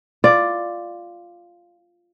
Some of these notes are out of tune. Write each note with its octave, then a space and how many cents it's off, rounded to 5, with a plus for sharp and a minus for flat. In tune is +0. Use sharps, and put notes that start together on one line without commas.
F4 -5 D5 +5